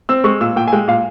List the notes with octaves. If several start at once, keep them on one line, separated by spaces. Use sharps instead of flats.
C4 E6
G#3 C#6
A#2 E6
A#2 G5
G#5
G#3 G5
A#2 F5